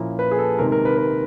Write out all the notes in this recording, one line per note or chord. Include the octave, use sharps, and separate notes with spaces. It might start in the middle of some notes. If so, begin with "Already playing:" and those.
Already playing: A#2 F3 A#3 C#4 E4
B4
G#4
A4
C3 D#3 G#3 A#4
A#4
B4
B4